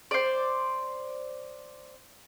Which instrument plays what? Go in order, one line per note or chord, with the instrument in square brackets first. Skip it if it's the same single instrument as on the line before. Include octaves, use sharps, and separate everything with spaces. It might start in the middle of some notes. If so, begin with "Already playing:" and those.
[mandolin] C5 D5